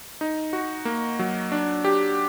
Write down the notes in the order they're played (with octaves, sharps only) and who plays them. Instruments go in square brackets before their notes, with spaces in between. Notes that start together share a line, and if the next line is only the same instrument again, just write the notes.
[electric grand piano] D#4
F#4
A#3
F#3
D4
G4